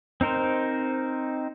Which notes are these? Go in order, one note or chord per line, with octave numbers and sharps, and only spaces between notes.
C4 D#4 A#4 C5